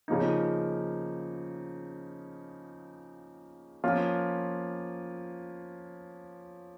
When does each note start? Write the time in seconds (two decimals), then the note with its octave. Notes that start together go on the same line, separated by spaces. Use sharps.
0.08 C#3 F3 A#3 D#4
3.84 F3 A#3 C#4 F4